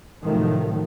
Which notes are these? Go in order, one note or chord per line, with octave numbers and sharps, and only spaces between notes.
A2 C3 D#3 F3 F#3 A3